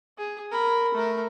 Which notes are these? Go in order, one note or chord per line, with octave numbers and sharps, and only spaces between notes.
G#4
A#4 B5
A3 A#4